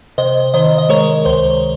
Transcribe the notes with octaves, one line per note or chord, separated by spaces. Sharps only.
C3 C5 D#5
D#3 C5 D#5
D#5
G#3 A#4 C#5
C#2 C5